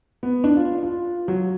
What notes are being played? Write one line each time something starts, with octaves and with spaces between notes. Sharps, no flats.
B3
D4
F4
F4
F#3